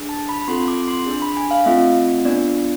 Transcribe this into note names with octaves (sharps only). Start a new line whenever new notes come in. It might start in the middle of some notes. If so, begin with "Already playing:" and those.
Already playing: D4 G#4
A5
B5
C4 F4 A4 C6
D6
C6
D4 G#4
B5
G#5
F5
F5
A3 C4 F4 E5
B3 D4 F4 D5